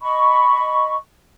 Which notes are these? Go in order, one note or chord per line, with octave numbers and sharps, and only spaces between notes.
D#5 B5 C#6